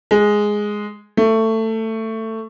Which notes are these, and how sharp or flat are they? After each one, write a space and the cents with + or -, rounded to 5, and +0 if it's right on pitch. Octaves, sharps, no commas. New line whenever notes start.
G#3 +0
A3 +20